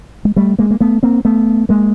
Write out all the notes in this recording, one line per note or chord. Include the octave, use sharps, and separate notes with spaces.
G#3
G3 A3
G#3 A#3
A#3
A3 B3
A#3 C4
A3 B3
G#3 A#3